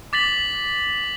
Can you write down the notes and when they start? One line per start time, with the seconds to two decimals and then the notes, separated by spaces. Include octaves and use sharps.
0.13 D6 A6 B6 F#7